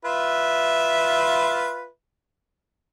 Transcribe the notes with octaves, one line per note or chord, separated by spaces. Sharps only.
F4 B4 E5